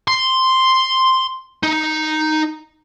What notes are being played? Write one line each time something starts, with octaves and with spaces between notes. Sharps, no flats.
C6
D#4